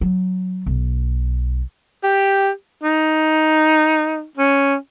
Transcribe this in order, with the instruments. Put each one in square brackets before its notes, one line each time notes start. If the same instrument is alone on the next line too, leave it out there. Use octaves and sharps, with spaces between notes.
[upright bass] F#3
B1
[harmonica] G4
[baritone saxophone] D#4
C#4